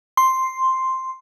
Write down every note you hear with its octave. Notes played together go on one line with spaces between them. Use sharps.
C6